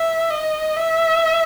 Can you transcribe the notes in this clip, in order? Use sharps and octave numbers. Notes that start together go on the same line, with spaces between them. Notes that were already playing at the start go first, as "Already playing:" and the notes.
Already playing: E5
D#5
E5